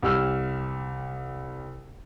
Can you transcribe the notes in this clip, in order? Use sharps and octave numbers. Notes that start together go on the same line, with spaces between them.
C2 G4 E6 F6